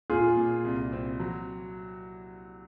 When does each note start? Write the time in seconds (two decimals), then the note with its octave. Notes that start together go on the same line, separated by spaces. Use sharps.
0.10 A#2 F4 G#4
0.37 A#2
0.64 C2
0.92 C4
1.20 F#3